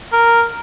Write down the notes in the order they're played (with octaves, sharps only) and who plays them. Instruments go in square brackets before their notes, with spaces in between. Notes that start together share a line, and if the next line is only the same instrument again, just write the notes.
[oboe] A#4